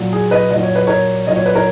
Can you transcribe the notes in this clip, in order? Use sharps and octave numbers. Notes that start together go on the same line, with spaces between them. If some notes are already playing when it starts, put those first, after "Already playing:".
Already playing: A#2 F#3
G#4
B4 D#5
A#2 F#3 D#5
C#5
B4
A#4 C#5
A#2 F#3 D#5
C#5
B4
A#4 C#5